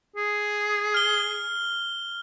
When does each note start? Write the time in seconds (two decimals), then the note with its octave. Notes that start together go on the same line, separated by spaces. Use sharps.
0.16 G#4
0.94 F6 G7